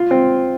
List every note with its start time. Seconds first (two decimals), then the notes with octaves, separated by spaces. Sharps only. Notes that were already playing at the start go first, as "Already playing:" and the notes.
Already playing: F4
0.11 C4